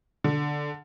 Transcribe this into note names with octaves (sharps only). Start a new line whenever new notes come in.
D3